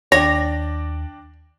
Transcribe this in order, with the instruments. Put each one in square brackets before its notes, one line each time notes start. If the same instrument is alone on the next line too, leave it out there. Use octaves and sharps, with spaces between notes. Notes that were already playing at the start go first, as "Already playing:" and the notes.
[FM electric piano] D#2 [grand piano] D4 D5 G5 [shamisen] C#5 [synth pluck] A#6